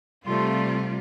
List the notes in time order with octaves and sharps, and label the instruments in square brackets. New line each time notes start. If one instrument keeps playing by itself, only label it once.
[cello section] C3 G3 F4 [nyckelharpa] A3 C6